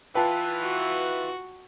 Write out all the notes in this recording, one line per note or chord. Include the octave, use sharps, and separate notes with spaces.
E3 F4 B4 G5 A5
F#4